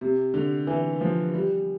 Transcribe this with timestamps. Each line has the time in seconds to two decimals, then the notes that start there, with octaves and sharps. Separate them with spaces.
0.01 C3
0.34 D3
0.67 E3
1.01 F3
1.34 G3